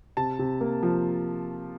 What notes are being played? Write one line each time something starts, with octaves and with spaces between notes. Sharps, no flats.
C3 A5
C3
A#3
F3